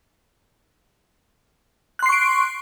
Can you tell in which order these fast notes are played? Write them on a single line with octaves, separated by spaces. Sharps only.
F#6 C6 C7 C#6 D7